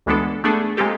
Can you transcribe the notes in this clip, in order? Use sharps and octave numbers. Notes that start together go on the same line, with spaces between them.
D2 E3 G#3 B3 D4 A4
A3 B3 D4 G#4 A4
G#3 A#3 C4 F4 G4 A4